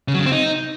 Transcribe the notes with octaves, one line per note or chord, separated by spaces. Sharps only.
C#3
F#3
C#3
C4
D#4